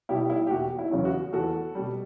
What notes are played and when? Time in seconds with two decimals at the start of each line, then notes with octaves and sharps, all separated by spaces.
0.09 B2 G3 E4 G4
0.30 E4
0.47 G4
0.50 E1 F#4
0.79 E4
0.91 E2 C#3 F#3 C#4
1.05 F#4
1.33 E2 F#4 A4
1.75 B2 G3